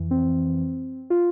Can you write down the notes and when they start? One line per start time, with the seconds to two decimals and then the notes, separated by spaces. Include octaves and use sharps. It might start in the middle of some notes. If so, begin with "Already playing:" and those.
Already playing: F2 E3
0.11 C4
1.10 F4